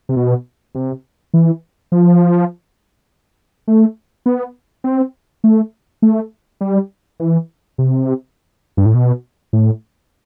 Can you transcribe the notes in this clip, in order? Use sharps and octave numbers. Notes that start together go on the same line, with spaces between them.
C3
B2
C3
E3
F3
A3
B3
C4
A3
A3
G3
E3
C3
G2
A2
B2
A2